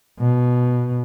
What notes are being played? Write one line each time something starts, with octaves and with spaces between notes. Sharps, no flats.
B2